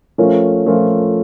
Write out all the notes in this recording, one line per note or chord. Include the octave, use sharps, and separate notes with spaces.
F3 A3 C#4 F4 A#4
F3 A3 C#4 F4 A#4